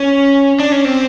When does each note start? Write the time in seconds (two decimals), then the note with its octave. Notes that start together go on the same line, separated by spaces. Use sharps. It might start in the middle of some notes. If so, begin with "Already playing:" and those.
Already playing: C#4
0.60 D4
0.72 C#4
0.85 C4